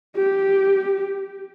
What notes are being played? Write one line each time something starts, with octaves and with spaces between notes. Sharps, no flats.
G4